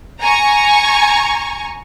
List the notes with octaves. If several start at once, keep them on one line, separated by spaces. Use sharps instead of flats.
G#5 A#5 C#6